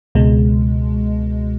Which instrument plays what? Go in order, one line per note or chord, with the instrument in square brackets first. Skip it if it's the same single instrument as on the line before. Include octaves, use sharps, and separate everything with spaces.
[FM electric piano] C#2 B2 G#3